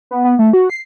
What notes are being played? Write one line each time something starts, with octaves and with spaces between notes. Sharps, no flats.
B3
B3
A3
F#4
C7